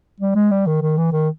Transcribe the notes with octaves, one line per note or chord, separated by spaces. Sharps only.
G3
G#3
G3
D#3
D#3
E3
D#3